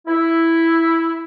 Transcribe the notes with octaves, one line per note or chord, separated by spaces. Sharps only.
E4